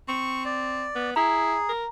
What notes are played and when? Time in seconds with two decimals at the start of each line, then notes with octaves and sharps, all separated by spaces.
0.08 C4 C#6
0.45 D5
0.95 B3
1.16 E4 G#4 A#5
1.69 A#4